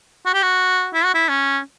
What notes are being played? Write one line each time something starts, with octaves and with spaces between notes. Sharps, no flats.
F#4
G4
F#4
E4
F#4
E4
C#4